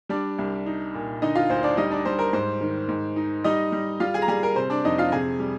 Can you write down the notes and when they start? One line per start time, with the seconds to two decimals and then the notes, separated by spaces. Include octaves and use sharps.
0.09 G3 D4 D5
0.38 C2
0.66 D#4
0.94 A#2
1.22 D3 D#4 D#5
1.35 F4 F5
1.49 D2 C5
1.63 D4 D5
1.77 G3 D#4 D#5
1.91 D4 D5
2.05 G3 C5
2.19 A#4
2.33 G#2 C5
2.61 D#3
2.88 G#2
3.16 D#4
3.44 G3 D#4 D#5
3.72 G3
4.00 G3 F4 F5
4.14 G#4 G#5
4.22 A#5
4.28 G3 G#4 G#5
4.43 A#4
4.56 C3 C5
4.70 D4 D5
4.85 F2 D#4 D#5
4.98 F4 F5
5.12 C3 G#4 G#5
5.40 G3